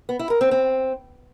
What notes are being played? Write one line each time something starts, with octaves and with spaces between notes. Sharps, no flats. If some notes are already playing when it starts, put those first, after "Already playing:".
B3
E4
A#4
C4
C4